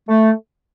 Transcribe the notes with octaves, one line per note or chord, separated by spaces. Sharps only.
A3